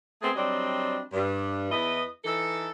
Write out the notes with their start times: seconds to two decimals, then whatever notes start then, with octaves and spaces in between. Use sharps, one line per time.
0.22 A3 B3 C4 G#4
0.35 F#3 G3 C4 D4 D#5
1.13 G2
1.71 E2 E4 B4 D#5
2.25 E3 D#4 A4